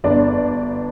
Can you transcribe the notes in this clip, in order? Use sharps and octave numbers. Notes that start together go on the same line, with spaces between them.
G1 D4 D5